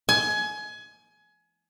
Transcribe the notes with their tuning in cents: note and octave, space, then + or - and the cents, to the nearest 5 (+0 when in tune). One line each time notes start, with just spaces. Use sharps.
G#5 +25